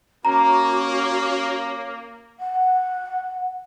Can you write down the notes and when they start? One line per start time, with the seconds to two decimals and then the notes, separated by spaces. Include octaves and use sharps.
0.25 A#3 C#4 F#4 C#5 A#5 D6
2.40 F#5